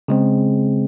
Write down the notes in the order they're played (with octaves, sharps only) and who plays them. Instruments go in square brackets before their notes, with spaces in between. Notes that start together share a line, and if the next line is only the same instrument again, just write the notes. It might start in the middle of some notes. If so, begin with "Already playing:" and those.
[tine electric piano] C#3 G#3 C4